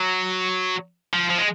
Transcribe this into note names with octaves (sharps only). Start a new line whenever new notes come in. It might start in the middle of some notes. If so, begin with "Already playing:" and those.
Already playing: F#3
F3
F3
G#3